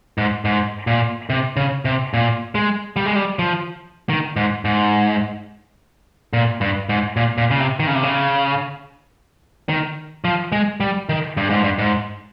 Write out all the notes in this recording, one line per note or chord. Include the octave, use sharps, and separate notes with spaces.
G#2
G#2
A#2
C3
C#3
C3
A#2
G#3
G3
G#3
G3
F3
D#3
G#2
G#2
A#2
G2
G#2
A#2
A#2
C#3
C3
D#3
C#3
C3
C#3
D#3
F3
G#3
G3
D#3
G2
G#2
G2
G#2